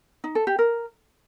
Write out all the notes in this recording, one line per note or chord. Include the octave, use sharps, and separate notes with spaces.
D#4
A4
G4
A#4